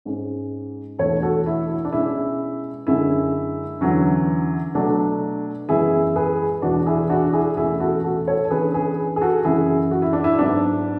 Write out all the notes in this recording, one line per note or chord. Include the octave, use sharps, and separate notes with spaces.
G#2 G#3 C#4
E2 B2 A3 D4 A4 C#5
F#4 A4
E4
E4
D4
B2 G#3 C#4 E4
F#2 D3 G#3 C#4 E4
E2 D3 F#3 C#4
B2 F#3 A3 D4
F#2 E3 G#3 B3 E4 G#4
G#4 B4
E2 B2 G#3 D4 F#4
E4 G#4
D4 F#4
E4 G#4
E2 B2 A3 C#4 E4 G#4
F#4 A4
F#4 A4
A4 C#5
A4
C#3 E3 B3 D4 G#4 B4
G#4 B4
G#4
F#4 A4
F#2 C#3 E3 G#3 E4 G#4
F#4
E4
D4
E4
G#2 F#3 B3 D4